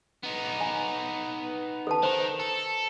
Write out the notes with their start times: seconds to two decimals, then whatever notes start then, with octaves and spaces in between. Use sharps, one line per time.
0.23 B3 D#4
0.61 G#5
1.87 A4 B4 A5
2.03 D#3 C5 A#5
2.40 A4